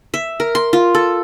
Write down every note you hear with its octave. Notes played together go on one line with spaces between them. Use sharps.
E5
A#4
C6
F4
A4